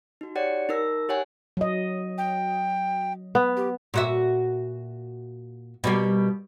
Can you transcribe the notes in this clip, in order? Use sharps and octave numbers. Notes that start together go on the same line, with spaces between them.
D#4 F#4
G4 C#5 D5 F#5 C#7
D#4 A#4 E6 A#6
G4 C#5 F#5 G#5
F#3 D#5
G5
B3
G4
A#2 F#4 E5
B2 G3 A#3